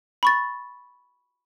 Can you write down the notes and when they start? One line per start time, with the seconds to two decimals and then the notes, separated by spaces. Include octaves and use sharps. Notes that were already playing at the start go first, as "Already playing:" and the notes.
0.23 B5 C#6 A6